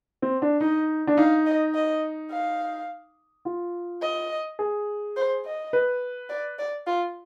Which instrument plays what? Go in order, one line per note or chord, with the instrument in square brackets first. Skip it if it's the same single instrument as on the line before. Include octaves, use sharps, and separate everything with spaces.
[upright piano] C4
D4
[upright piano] D#4 [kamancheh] D#5
[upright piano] D4
[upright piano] D#4 [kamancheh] F5
[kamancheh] D#5
D#5
F5
[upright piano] F4
[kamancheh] D#5
[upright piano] G#4
[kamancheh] C5
D#5
[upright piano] B4
[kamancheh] D5
D5
F4